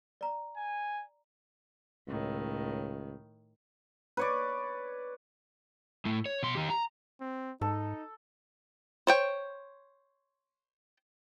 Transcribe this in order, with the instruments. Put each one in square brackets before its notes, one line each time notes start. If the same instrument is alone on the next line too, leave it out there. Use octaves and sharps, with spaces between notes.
[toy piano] D5 A#5
[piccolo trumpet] G#5
[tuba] C#2 [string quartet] A2 D#3
[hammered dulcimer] B4 C#5 D5
[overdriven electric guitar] A2 A3
C#5
B2 C6
D#3 G4
A#5
[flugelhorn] C4
[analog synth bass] G#2 [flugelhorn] D#4 [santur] A4
[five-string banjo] C5 C#5 G5